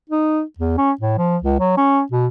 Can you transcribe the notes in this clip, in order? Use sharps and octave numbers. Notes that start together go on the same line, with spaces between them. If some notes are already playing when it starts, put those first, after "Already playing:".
D#4
E2
C#4
A2
F3
C#2
F#3
C#4
B2